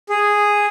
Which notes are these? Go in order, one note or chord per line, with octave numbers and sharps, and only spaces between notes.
G#4